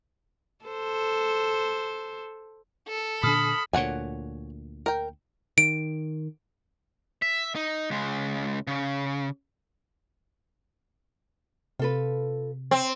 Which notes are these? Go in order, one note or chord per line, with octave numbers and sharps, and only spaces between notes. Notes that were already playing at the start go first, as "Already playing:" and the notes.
A4 C5
A4
A#2 D3 D4 B5 D#6 F6
D2 A#2 C#5 F#5 G#5
A#4 G5
D#3 D7
E5
D#4
C#2 G#3
C#3
C3 F4 A4 B4
C4